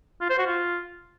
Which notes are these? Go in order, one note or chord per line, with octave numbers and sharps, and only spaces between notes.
F4
C5
F#4
F4